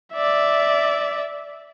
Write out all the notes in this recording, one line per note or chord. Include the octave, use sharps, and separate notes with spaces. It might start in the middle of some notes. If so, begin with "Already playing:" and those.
D5 E5